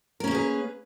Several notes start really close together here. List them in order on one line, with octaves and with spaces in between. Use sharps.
A#4 C#4 A#3 G#4 B4